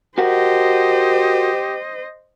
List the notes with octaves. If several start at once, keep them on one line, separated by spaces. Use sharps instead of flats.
F#4 G4 A#4 C5 D#5 F#5